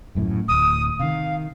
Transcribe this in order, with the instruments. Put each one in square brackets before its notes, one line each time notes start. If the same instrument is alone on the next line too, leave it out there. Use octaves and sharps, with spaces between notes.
[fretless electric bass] D#1 F#2 A2
[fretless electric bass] D1 D2 [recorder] D#6
[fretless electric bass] C3 D#3 [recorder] F5